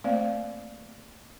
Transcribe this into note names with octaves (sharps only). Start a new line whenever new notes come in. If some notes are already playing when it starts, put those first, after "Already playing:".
A3 A#3 C4 C5 D5 F5